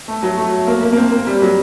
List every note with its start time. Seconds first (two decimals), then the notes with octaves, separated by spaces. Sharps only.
0.08 A3
0.23 F#3
0.38 A3
0.68 A#3
0.83 A#3
0.93 A#3
0.97 C4
1.12 A#3
1.27 G3
1.42 F#3